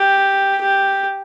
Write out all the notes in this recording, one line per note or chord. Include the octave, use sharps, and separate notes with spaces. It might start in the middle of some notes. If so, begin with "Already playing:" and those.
Already playing: G4
G4